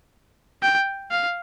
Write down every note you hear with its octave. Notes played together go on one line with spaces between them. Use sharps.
G5
F5